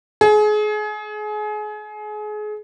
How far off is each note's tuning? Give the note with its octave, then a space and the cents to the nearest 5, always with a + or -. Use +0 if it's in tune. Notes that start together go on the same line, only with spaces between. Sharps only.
G#4 +30